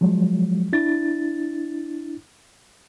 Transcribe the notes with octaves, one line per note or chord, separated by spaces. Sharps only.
F3 F#3 G#3
D4 E4 A6